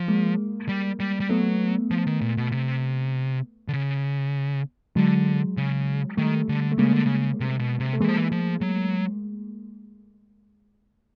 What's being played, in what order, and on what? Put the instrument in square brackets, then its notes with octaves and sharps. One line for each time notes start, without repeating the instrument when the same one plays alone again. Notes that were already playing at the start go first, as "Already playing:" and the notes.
Already playing: [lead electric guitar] F3
[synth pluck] G#3 A#3
[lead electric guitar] G3
G3
G3
[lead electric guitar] F#3 [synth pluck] A3 B3
[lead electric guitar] F3
D#3
A#2
B2
C3
D3
C#3
[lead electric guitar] D3 [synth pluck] F#3 G#3
[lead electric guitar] C#3
[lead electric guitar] D#3 [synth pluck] G3 A3
[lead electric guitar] D3
[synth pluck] A3
[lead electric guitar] C#3 [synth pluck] G#3 A#3
[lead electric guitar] D3
C#3
C3
B2
C3
[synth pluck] A3
[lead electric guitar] E3 [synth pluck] G#3 A#3
[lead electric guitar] F3
E3
F3
F#3